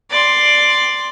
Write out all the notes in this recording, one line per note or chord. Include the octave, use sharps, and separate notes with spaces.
D5 C6